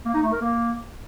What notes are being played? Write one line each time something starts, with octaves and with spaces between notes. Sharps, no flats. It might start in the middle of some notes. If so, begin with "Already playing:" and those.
A#3
D#4
A3
A#4
A#3